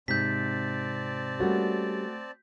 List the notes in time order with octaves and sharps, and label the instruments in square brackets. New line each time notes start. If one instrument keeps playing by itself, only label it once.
[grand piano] G#2 [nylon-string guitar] C3 [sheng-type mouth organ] C4 D5 A5 [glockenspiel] G6 B6
[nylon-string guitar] G3 A#3 C#4 [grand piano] A3 F#4